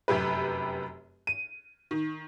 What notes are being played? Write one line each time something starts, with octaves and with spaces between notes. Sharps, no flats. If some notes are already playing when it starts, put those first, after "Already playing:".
F1 F#2 G4 B4
D#7
D#3